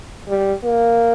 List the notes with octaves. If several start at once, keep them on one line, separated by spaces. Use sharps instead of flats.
G3
A#3